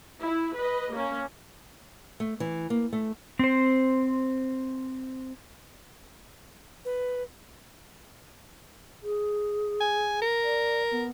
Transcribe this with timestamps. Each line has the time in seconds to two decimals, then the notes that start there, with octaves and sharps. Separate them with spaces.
0.22 E4
0.56 B4 D#5
0.92 A#3 C#4
2.20 A3
2.40 E3
2.70 A#3
2.93 A3
3.39 C4 C5
6.85 B4
9.02 G#4
9.81 G#5
10.22 A#4
10.43 D5
10.91 B3